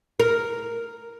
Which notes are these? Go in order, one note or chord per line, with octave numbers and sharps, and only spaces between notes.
A#4